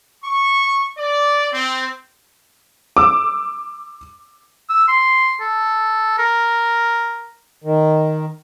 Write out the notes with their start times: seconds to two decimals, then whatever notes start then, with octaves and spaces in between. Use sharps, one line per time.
0.23 C#6
0.97 D5
1.50 C4
2.97 D6 E6
4.70 E6
4.88 C6
5.41 A4
6.18 A#4
7.64 D#3